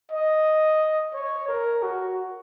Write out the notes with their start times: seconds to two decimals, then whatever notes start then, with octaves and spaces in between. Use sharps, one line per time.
0.12 D#5
1.14 C#5
1.48 A#4
1.82 F#4